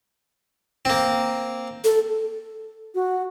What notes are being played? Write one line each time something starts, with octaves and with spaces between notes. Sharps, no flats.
A#3 C4
A4
F#4